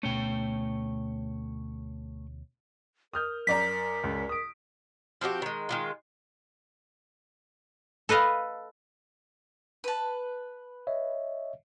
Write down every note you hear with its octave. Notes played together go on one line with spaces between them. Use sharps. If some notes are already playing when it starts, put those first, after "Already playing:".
D2 B2 A3 C#4 C#5 G5
A#4 D#6 F6 G6
F#2 D5 A#5 B6
C#2
D#6 D7
F3 C4 F#4 G4
D#3 G#3
D#3 G#3 F4
A4 B4 D#5 F5
B4 A5
C#5 D#5 E5